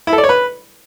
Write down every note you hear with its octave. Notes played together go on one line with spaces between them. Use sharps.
E4
A4
D5
C#5
B4